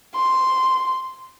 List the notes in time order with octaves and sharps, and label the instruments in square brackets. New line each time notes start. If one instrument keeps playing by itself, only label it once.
[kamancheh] C6